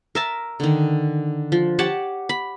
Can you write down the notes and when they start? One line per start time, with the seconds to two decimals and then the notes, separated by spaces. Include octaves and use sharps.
0.15 A#4 E5 A5
0.60 D3 D#3
1.52 F3
1.79 G4 C#5 F#5 A5
2.29 B5